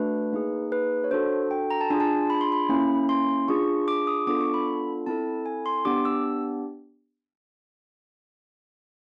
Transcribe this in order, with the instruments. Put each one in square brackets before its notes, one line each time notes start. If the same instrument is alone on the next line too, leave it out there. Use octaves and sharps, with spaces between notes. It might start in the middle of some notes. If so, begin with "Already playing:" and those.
Already playing: [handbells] A3 D4 F#4 B4
A#3 D#4 G#4
B4
C#5
D4 F#4 A4 C5
G5
A#5
A5
D4 F4 G#4 G#5
A5
B5
C6
B5
A#3 C#4 E4
C6
D4 F4 G#4 C#6
D6
D#6
B3 D4 F4 A4 D6
C#6
B5
C4 E4 A4 A5
G#5
C6
B3 D4 G4 D6
E6